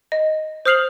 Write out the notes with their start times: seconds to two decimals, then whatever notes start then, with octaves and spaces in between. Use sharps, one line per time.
0.12 D#5
0.65 C5 D#6 F6 C7 F7 F#7